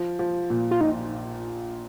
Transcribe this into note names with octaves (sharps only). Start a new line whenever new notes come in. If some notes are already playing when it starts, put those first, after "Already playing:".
Already playing: F3
F3
A#2
F4
A#1 D#4